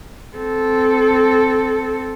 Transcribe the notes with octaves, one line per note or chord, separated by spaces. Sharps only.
C4 A4